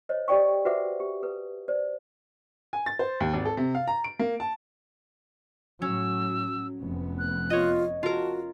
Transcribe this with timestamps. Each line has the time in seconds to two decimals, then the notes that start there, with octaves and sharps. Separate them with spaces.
0.09 C5 C#5 D#5
0.28 G4 A4 D5 G5 C#6
0.65 F#4 B4 C5 E5 F#5 D6
1.00 G4
1.23 A4 B4
1.68 C5 D5
2.73 G#5
2.86 A6
2.99 C5
3.20 D#2
3.34 G#1
3.45 A4
3.57 C3
3.75 F5
3.88 A#5
4.04 D7
4.19 A#3
4.40 A5
5.82 A2 F#3 C#4 E6
6.79 F1 B3
7.19 F#6
7.50 F4 C#5 D#5
8.03 F4 F#4 A#4 A5